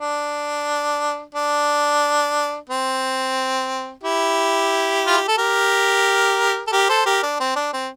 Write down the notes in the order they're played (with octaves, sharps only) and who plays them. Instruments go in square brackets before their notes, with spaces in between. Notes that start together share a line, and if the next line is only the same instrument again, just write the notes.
[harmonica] D4
D4
C4
E4 G4
F4
G4
A4
G4 A#4
A4
G4 A#4
A4 C5
G4 A#4
D4
C4
D4
C4